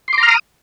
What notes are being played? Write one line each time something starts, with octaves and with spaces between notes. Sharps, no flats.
A#5 C6 D6 D#6 F6